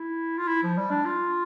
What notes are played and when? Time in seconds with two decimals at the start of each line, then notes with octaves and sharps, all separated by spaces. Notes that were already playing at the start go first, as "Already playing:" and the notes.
Already playing: E4
0.38 F4
0.48 E4
0.63 F3
0.77 G3
0.90 D4
1.05 F4